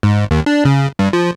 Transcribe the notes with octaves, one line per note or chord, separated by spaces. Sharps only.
G#2
D#2
D4
C#3
G2
F3